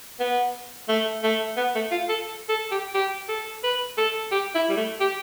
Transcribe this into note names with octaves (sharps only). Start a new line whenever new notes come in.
B3
A3
A3
B3
A3
F4
A4
A4
G4
G4
A4
B4
A4
G4
E4
G3
A3
G4